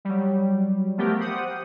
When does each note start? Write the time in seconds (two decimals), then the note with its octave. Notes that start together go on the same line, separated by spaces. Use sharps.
0.05 F#3 G3
0.97 F3 A3 B3 G4 A#4
1.20 G4 C5 F#5 D#6